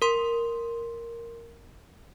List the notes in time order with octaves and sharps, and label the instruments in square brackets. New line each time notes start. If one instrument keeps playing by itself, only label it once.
[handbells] A#4 C6